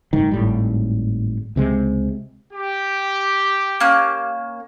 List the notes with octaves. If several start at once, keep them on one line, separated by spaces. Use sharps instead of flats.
F#1 G#2 D#3
G#1 A2 G3
C#2 C3 G#3
G4
A#3 C#4 F#6